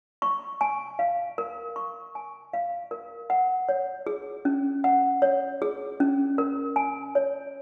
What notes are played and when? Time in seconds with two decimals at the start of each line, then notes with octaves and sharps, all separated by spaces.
0.22 C#6
0.61 G#5
0.99 F5
1.38 A#4
1.76 C#6
2.15 G#5
2.53 F5
2.91 A#4
3.30 F#5
3.69 C#5
4.07 G#4
4.45 C#4
4.84 F#5
5.22 C#5
5.62 G#4
6.00 C#4
6.38 A#4
6.76 G#5
7.15 C#5